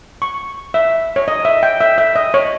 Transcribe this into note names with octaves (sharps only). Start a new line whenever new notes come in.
C#6
E5
C#5
D#5
E5
G5
E5
E5
D#5
C#5